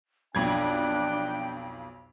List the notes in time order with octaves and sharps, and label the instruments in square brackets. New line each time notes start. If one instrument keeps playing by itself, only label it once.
[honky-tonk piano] B1 F2 G#6 [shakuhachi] D4 [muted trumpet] G5